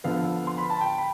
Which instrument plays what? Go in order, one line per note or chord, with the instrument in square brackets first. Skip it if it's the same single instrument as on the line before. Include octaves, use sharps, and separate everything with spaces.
[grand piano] D3 F3 B3 F5
C6
B5
A5
G5
B5